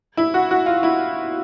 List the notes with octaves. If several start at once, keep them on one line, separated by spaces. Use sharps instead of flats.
E4
F#4
F#4
F4
E4